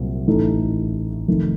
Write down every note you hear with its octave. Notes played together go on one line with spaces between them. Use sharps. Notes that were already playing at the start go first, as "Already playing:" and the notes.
Already playing: C2 A#2 F#3 C4
A1 A2 A3 D#4 A4
F1 F2 D#3 A3 D#4